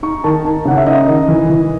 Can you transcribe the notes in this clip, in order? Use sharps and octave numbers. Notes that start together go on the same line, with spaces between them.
D#4 C#6
D#3 A5
D#4 A5
C#3 F#5
E5
D#4 D#5
D#3
E3
E3